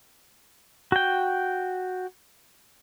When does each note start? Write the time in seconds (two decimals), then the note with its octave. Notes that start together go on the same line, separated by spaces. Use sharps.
0.92 F#4 G5